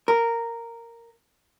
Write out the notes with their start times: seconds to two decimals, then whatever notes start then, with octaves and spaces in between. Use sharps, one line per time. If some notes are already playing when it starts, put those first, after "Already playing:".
0.08 A#4